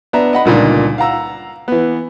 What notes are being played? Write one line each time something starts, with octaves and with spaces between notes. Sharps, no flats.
B3 D4 E5 A#5
D#5 F#5 B5
C#2 G2 A#2 D3 D#4 D5
F5 F#5 A#5 E6
E3 B3